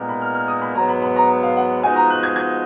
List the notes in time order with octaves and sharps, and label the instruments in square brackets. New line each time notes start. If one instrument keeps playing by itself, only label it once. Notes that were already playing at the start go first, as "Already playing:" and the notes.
Already playing: [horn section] A#2 G#3 B3 D#4 A#4
[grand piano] B5
F6
F6
D#6
B5
[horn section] G#2 F#3 B3 [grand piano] A#5
[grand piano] B5
B5
A#5
F5
F#5
[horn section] F3 G#3 B3 D#4 F#4 [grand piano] G#5
[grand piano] A#5
F#6
G#6
G#6